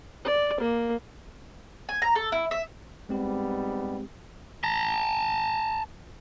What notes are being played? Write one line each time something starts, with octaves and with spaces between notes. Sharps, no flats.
D5
A#3
G#5
A#5
A4
E4
E5
G#2 G3 G#3 B3 C4 G4
A5 A#5